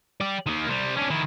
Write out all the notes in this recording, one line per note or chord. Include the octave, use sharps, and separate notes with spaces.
G4 D5
D#3 A#3
C3 G3
C#4 D4
D#3 E4